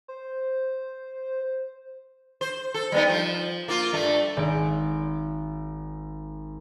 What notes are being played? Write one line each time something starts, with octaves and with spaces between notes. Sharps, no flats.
C5
C5
A4
G3 B3 D#4
F3
A#3 F4
G2 A3
G#1 D7